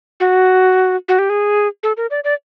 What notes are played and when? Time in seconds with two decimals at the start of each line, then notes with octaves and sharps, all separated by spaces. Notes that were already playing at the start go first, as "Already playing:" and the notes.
0.20 F#4
1.08 F#4
1.19 G4
1.30 G#4
1.83 A4
1.97 A#4
2.11 D5
2.24 D5